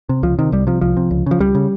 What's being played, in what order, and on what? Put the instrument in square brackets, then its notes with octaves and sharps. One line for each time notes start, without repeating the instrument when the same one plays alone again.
[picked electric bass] C3
C#2 F3
C3 D#3
C2 G3
C3 F3
C2 F3
C3
C#2
C#3 F3
C#2 G3
C#3